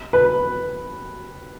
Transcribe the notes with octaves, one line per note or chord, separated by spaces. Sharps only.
B4